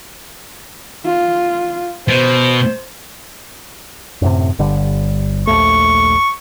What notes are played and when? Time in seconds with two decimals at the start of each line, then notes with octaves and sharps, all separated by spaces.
1.06 F4
2.08 B2 C5
4.22 F#2 A2 C3
4.59 G1 D3 G3
5.47 A#1 D#2 A3 C#6